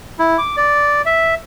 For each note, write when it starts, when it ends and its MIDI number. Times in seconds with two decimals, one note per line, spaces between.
0.19 0.37 64
0.38 0.56 86
0.57 1.02 74
1.06 1.35 76